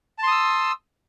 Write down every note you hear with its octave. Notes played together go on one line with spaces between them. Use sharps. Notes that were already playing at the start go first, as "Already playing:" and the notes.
A5 C6 D#6 E6